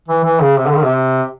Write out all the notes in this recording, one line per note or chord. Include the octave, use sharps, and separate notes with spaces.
E3
E3
C#3
C3
D3
D#3
C3